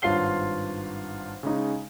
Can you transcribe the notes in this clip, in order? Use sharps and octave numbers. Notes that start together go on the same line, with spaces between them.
G#1 G2 F4 C#5 C7 G7
C#3 G#3 D#4